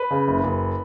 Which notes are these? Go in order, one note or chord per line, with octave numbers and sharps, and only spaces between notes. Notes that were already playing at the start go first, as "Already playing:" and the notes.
Already playing: B4
C#3
F#1
F#1